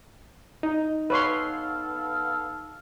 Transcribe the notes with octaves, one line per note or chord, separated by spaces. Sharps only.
D#4
B3 A4 B4 C#5 F5 C6